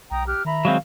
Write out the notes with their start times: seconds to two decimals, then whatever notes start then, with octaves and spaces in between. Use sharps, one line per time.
0.11 B1 G5 A#5 D#6
0.26 G4 F6 F#6
0.45 D#3 E5 A#5 B5
0.65 F#3 G#3 C4 F5